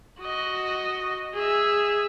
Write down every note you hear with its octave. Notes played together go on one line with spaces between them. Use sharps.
F#4 D#5
G#4 E5